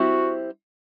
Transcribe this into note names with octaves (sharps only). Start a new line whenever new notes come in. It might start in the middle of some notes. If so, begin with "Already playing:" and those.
Already playing: G3 C4 E4 F#4 G4